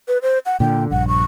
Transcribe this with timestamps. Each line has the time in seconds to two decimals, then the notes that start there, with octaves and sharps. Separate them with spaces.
0.08 B4
0.22 C5
0.46 F#5
0.60 A#2 D3 G5
0.91 A#1 G2 F#5
1.08 C#6